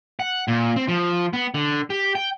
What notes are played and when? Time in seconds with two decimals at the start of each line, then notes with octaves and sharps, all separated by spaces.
0.20 F#5
0.48 A#2
0.76 C4
0.88 F3
1.33 B3
1.54 D3
1.90 G4
2.15 G5